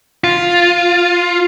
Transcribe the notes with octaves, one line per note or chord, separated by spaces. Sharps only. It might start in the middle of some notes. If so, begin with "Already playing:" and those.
F4